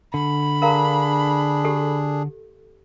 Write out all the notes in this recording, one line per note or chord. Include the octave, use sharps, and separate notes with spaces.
D3 B5
D4 G#4 A#4 F5 A#5
G4 A4